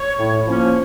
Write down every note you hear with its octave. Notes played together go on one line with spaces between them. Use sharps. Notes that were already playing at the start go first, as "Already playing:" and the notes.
Already playing: C#5
A2
F3 A#3 C#4